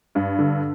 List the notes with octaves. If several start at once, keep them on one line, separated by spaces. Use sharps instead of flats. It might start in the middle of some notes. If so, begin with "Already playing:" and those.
G2
D3